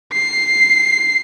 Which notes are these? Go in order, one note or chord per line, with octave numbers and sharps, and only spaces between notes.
C7